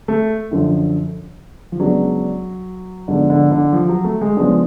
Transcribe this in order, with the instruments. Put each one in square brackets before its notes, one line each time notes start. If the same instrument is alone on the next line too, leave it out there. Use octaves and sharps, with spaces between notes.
[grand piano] A3
[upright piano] F#2 D3 F3
[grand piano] F3
[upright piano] C#3 G#3 B3 D4 [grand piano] F#3
[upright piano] G#2 F3 B3 D4 [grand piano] D3
[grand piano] D3
D3
F3
F#3
A3
G#3
[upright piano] C#3 F3 B3 D4 [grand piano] G#3